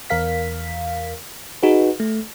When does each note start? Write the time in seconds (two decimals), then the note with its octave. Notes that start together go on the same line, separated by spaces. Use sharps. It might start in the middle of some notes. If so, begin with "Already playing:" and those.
0.10 E2 A#4 F5 B6
1.63 D#4 F#4 G#4 B4
2.00 A3